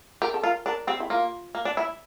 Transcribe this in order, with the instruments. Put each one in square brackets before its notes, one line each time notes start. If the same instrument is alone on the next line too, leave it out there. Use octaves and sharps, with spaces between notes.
[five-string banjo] G4 [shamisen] A#4
[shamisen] A4
[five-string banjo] F4 [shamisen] A#4
[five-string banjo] D4 [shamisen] A#4
[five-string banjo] C4 [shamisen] G4
[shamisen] E4
[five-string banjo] A#3 [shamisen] F4
[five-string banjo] A#3
D4
E4